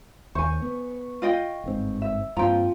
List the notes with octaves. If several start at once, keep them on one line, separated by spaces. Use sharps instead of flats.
D#2 C5 G#5 C#6
B3
F4 D#5 G5
G1 G#2 C4
E5
G2 F3 A#3 C4 G5 A#5